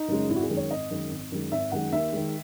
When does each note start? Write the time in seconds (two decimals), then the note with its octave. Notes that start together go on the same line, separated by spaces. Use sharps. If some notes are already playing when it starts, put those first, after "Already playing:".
Already playing: D#4
0.08 F#2 C#3 G#3
0.29 G#1 E4
0.36 F#4
0.43 G#4
0.50 F#2 D#3 G#3
0.57 C#5
0.70 G#1 D#5
0.91 F#2 D#3 G#3
1.11 G#1
1.32 F#2 D#3 G#3
1.52 G#1 E5
1.72 F#2 D#3 G#3 F#5
1.92 D#2 E5
2.13 D#3 G#3